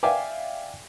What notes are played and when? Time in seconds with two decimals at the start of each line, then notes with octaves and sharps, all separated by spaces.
0.03 D5 E5 F5 G5 G#5 D6